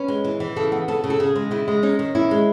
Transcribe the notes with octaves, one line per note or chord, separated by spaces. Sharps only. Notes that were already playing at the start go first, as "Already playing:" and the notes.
Already playing: C#4 B4
G#3
E3
E3
C#3 A4
B3
C#3 A4
C#3
A4
C#3 G#4
G#3
C#3 E4
G#3
C#4 D#4
D#3
C#4 E4
G#3